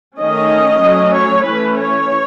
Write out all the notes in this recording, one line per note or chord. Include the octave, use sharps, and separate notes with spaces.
D#3 A3 C#4 D#5
F#3 A3 C#4
C#5
E3 A3 C#4 B4
C#5